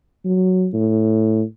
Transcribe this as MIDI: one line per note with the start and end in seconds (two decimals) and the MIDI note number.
0.25 0.69 54
0.74 1.42 45